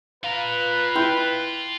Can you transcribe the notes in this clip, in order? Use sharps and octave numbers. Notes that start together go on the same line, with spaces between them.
F4 B4 F5 A#5
E4 G5 C6 G6